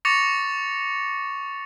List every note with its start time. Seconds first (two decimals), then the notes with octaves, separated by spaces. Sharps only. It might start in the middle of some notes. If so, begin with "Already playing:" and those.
0.05 C#6 D6 A6 A#6 C#7 F7